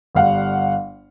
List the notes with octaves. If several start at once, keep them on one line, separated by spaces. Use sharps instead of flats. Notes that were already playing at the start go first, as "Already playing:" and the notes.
G1 G3 F5 F#5